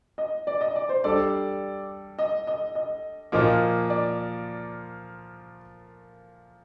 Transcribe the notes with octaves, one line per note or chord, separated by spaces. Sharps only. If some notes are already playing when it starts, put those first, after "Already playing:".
D#5
D5
D#5
D5
C5
G3 D4 A4 D5
D#5
D#5
D#5
A#2 F3 A#3 D#5
D5